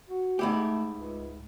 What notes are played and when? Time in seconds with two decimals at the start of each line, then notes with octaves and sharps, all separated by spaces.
0.09 F#4
0.39 G#2 A3 E4 G4
0.92 C#2